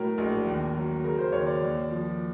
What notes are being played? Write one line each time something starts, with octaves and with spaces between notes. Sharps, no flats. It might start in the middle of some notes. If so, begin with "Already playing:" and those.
Already playing: A2 F#3 A#4
A#1
D#2
F#3
C#3 A#4
C5
D#2 C#5
D5
D#2
F3